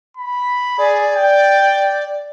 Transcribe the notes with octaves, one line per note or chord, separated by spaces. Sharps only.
B5
G#4 D5
G5